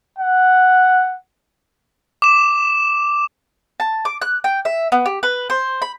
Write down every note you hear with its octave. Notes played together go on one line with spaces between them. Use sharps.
F#5
D6 E7
A5
D6
F#6
G5
E5
B3
G4
B4
C5
B5